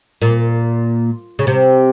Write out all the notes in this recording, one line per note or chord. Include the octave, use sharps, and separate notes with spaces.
A#2
C#3
C3